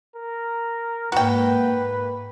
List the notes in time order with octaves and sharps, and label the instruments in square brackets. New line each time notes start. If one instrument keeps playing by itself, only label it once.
[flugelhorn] A#4
[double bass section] G#2 A#3 [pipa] F#4 G5 [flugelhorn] B4